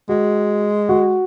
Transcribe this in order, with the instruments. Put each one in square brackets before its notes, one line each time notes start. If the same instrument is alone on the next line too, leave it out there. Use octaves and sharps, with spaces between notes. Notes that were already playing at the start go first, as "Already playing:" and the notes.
[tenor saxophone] G#3 [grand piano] F#4
[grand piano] F#4